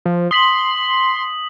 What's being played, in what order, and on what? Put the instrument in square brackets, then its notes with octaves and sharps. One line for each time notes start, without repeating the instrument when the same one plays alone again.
[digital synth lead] F3
[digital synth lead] C6 [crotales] D#6 B6 F#7